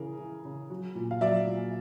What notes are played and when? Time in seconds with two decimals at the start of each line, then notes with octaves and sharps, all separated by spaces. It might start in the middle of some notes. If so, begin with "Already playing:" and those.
Already playing: C#3 E3 G#4 A#4
0.19 E3
0.45 C#3
0.70 F#3
0.95 A#2
1.11 F5
1.21 F#3 D5 E5
1.47 A#2